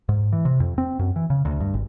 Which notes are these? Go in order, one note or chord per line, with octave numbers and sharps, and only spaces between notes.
G#2
E3
C3
F2
C4
F#2
E3
C#3
D2
G2
G#1